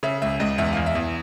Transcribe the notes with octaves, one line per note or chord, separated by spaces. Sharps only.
C#3 E5
C#2 E5
C#2 D#5
E2 E5
E2 F5
E5
E2